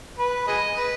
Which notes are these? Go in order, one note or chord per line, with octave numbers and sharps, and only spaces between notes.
B4
G#4 B4 D#5
B4